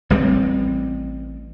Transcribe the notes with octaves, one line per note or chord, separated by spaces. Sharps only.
A1 G3 G#3 C4